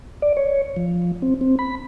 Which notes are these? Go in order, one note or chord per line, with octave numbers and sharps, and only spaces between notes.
D5
C#5
F3
C4
C4
B5